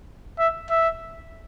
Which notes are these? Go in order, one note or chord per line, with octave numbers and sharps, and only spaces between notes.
E5
E5